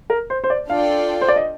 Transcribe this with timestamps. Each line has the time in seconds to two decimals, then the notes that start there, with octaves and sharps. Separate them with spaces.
0.10 A#4
0.30 C5
0.44 C5
0.50 D5
0.69 D4 F4 A4 D5 F5 G5
1.21 C5
1.28 D5
1.36 D#5